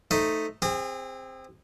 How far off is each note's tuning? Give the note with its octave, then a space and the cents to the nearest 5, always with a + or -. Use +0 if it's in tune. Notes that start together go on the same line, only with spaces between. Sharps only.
A3 +0 D#4 +0 C5 +0
C4 +0 G#4 -35